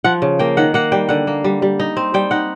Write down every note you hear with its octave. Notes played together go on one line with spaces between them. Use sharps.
F3 F#5
C#3
A#3 G5
D#3 F#5
A#3 F#5
G3 G5
D3 F#5
A#3
G3
G3
D#4
C4
G3 G5
D#4 F#5